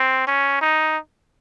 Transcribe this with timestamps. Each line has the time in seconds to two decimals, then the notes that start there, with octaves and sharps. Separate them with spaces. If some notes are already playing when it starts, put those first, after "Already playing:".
Already playing: C4
0.27 C#4
0.61 D#4